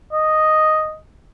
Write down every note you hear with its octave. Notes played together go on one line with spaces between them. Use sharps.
D#5